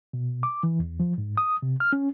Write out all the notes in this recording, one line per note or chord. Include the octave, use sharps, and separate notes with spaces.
B2
D6
E3
E2
F3
G#2
D#6
C3
F6
C#4